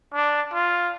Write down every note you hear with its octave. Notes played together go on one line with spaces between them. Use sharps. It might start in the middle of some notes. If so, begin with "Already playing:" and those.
D4
F4